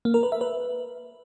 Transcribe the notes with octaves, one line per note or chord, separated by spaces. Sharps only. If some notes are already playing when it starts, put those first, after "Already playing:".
A#3
A#4
B4
E5
B4